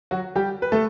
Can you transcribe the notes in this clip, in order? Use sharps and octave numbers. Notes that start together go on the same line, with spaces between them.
F#3 F#4
G3 G4
B4
A3 A4